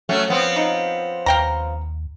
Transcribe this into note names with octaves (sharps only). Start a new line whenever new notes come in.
F#3 A3 C#4
F3 B3 C4
D#4
D#2 F5 G5 A#5